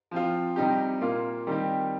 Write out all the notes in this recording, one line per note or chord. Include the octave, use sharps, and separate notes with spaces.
F3 C4 F4
C3 G3 D#4 G4
A#2 A#3 F4
D#3 G3 C4 D#4 G4